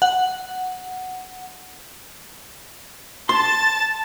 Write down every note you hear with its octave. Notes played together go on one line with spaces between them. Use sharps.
F#5
A5 C6 A6